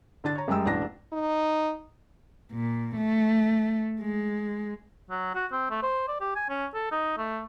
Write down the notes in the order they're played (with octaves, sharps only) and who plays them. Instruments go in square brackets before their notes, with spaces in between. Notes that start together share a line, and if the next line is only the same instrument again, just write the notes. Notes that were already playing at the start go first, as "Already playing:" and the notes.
[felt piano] D3 D4 A6
C#5 A#5
F#2 G3 G#3 G5 E6
E1 A1 D4 A#5 A#6
[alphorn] D#4
[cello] A#2
A3
G#3
[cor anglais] F#3
F#4
C4
A3
C5
D5
G4
G#5
C#4
A4
D#4
A3